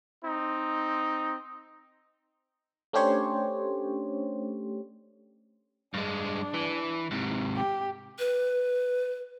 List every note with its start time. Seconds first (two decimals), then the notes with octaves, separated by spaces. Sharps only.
0.24 C4 D#4
2.93 A3 C#4 D4 G4 C5 C#5
5.94 G2 G#3 D4
6.54 E3
7.11 G#2 C3
7.56 G4
8.19 B4